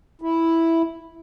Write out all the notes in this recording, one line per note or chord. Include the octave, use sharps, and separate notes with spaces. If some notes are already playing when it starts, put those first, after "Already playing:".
E4